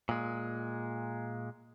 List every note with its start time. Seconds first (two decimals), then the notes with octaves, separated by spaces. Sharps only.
0.09 A#2 G#3